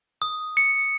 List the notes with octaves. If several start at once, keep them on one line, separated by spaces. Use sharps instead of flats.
D#6
C#7